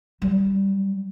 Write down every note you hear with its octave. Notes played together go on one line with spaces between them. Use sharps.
F#3 G3